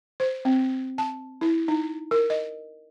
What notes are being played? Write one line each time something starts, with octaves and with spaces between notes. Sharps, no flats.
C5
C4
A5
E4
D#4
A#4
D#5